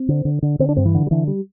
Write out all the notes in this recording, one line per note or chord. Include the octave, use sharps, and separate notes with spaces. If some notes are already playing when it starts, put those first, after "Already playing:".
Already playing: C4
D3
D3
D3
D3 C4
D4
G2 C4
E3
D3
G3
D3 E3
G3